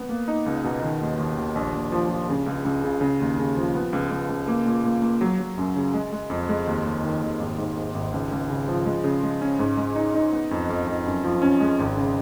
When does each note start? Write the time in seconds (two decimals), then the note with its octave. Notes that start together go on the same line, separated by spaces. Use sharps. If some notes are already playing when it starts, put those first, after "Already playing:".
Already playing: B3
0.09 A#3
0.28 D#4
0.46 C#2
0.64 B2
0.82 D#3
1.01 D#2
1.18 D#2
1.37 D#2
1.56 A#1
1.74 A#1
1.92 F3
2.10 F3
2.29 C#3
2.46 C#2
2.65 C#2
2.84 C#3
3.01 C#3
3.20 D#2
3.39 C#3
3.57 F3
3.75 B3
3.93 C#2
4.11 C#2
4.29 C#2
4.48 A#3
4.65 A#2
4.84 A#2
5.02 A#3
5.21 F#3
5.39 F#3
5.58 F#2
5.76 C#3
5.94 G#3
6.12 G#3
6.30 F2
6.49 G#3
6.67 D#2
6.86 D#2
7.04 D#3
7.22 D#2
7.40 G#1
7.58 G#2
7.77 G#2
7.94 G#1
8.12 C#2
8.32 C#2
8.49 C#3
8.68 F3
8.85 G#3
9.04 C#3
9.23 G#3
9.41 C#4
9.59 G#2
9.77 G#3
9.96 D#4
10.15 D#4
10.33 B3
10.51 F2
10.69 F2
10.87 F2
11.06 F#2
11.24 F3
11.42 C#4
11.60 G#3
11.79 G#1
11.97 C#3